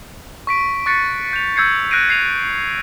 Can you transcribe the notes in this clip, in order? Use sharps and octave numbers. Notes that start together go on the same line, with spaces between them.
C#6 B6 D7
C#6 F#6 A6 B6 C#7 D7
G6 F7
E6 G6 G#6 C7 C#7
F#6 G6 A#6 C7 D7 D#7
G#6 C7 D#7 F7